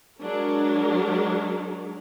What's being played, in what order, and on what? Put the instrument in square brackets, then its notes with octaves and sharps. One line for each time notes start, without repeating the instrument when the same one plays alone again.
[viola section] F#3 G#3 D4 A#4